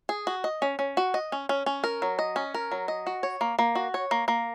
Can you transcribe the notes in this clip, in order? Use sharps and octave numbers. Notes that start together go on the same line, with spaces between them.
G#4
F#4
D#5
C#4
C#4
F#4
D#5
C#4
C#4
C#4
A#4
F#3
D#5
C#4
A#4
F#3
D#5
F#4
C#5
A#3
A#3
F#4
C#5
A#3
A#3